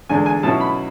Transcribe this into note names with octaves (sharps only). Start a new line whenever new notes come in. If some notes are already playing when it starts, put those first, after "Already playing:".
E2 D3 G#3 D4 G#5
G#5
B2 F#3 C#4 E4 A5
B5